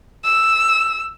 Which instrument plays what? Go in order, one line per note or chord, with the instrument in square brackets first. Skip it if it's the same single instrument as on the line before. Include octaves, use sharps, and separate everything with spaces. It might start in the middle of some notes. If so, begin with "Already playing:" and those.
[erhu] E6